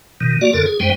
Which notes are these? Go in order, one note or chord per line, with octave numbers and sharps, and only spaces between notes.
B2 D#3
A#3 F#4 D5
F2 D3 A4 A#4
G#4
F#2 G3 G#3 C5 G5